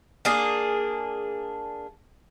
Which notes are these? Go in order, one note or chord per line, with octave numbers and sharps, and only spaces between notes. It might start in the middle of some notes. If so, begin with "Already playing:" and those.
A#3 D4 G#4